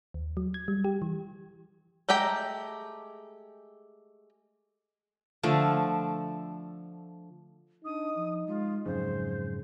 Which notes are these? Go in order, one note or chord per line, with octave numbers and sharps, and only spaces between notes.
D#2
F#3
G#6
G3
G4
E3
G#3 A3 G4 G5 A#5
D3 F3 A3
D4 D#4 D#6
F3
G#3 F4
F2 G#2 C#3 F#3 C5